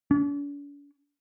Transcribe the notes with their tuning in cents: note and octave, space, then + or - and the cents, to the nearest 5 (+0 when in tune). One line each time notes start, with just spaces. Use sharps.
D4 -45